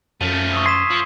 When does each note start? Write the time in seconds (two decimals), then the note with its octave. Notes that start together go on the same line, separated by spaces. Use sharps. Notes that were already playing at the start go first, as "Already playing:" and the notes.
0.21 F#2 F3 A3 D#7
0.53 C#6 D#6 E6
0.66 C6 G#6 B6 E7
0.91 F3